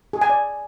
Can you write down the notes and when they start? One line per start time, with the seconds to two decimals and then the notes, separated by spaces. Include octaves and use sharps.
0.13 G#4
0.21 G#5
0.30 D5